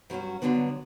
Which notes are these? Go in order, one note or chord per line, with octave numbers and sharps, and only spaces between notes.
G2 F#3 C#4 F#4
G2 D3 F#3 B3 D4